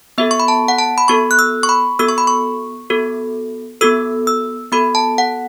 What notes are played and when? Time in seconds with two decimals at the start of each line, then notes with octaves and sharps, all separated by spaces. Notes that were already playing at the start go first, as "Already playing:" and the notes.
0.18 B3 F#4 A4 E5
0.31 C#6
0.40 B5
0.48 A5
0.68 F#5
0.78 A5
0.98 B5
1.08 B3 F#4 A4 C#6
1.31 F#6
1.39 E6
1.63 C#6
1.69 B5
1.99 B3 F#4 A4 E6
2.09 C#6
2.18 B5
2.27 C#6
2.90 B3 F#4 A4
3.81 B3 F#4 A4 E6
4.27 E6
4.72 B3 F#4 A4 B5
4.95 A5
5.18 F#5